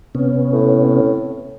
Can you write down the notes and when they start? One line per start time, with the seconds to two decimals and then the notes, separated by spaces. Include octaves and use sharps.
0.15 C3 B3 C#4
0.53 A2